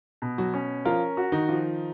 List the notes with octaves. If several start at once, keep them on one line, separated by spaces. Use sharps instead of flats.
B2
F#3 F#4
C#4
F3 F4 A#4
F#4
D#3 D#4
F3